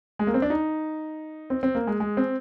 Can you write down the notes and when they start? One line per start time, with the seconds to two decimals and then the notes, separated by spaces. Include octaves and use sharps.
0.19 G#3
0.27 A#3
0.34 C4
0.42 D4
0.50 D#4
1.50 C4
1.63 C4
1.75 A#3
1.87 G#3
2.00 G#3
2.17 C4